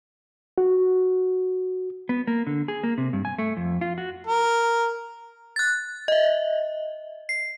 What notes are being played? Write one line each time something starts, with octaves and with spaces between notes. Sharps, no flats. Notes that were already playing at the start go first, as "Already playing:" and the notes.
F#4
B3
A#3
D3
G#4
A#3
C3
G2
G#5
A3
F2
F4
F#4
A#4
F#6 A6
D#5 E5
C7